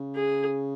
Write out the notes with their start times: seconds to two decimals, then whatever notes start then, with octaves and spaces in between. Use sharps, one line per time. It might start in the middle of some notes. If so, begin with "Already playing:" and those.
Already playing: C#3
0.16 G#4